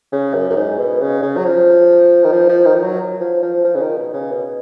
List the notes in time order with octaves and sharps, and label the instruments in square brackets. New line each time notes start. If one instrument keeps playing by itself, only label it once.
[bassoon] C#3
F#2
F#2
G#2
B2
C#3
C#3
F#3
F3
D#3
F3
F3
D#3
F3
F#3
F3
F3
F3
C#3
D#3
B2
C#3
B2